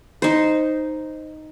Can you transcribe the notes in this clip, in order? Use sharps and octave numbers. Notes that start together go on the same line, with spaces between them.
D#4 C5